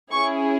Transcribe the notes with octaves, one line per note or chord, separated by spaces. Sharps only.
C#4 E4 G#4 C#6